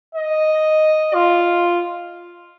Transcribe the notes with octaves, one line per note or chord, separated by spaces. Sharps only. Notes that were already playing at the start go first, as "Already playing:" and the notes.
D#5
F4